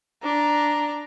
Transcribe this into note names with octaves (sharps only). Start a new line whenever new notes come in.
D4 A#5